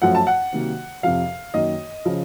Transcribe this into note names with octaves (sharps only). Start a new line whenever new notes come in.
F#2 F3 A3 F#5
A5
F#5
C3 D#3 F#3 A#3
F2 C3 F3 F5
F#2 D#3 A#3 D#5
C#3 F3